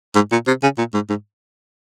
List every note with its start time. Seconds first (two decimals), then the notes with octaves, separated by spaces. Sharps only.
0.15 G#2
0.32 A#2
0.47 C3
0.63 C#3
0.78 A#2
0.94 G#2
1.09 G#2